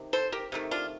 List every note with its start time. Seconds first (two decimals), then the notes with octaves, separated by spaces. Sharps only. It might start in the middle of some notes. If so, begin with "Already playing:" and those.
Already playing: C3 D#3
0.13 A4 C5
0.32 G4 A#4
0.52 C3 D#3 A3
0.71 D4 F4